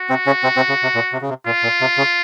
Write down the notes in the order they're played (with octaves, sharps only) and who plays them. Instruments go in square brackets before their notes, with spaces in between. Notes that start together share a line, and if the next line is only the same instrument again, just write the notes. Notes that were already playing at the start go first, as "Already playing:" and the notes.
Already playing: [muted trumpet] F#4
[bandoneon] C3 C4
C#3 C#4
C3 C4
C3 C4
C#3
C3
A#2
C3
C#3
C3
[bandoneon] A#2 [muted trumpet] F4
[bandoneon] A#2
C3
C#3